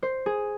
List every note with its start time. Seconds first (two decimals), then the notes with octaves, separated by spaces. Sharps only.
0.03 C5
0.26 G#4